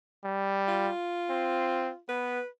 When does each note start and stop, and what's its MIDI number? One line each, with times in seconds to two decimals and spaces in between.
0.24 0.90 55
0.68 1.99 65
1.30 1.91 60
2.09 2.39 59
2.09 2.47 71